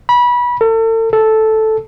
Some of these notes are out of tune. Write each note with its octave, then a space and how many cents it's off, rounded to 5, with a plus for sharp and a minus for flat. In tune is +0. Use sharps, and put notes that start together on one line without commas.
B5 -25
A4 +40
A4 -5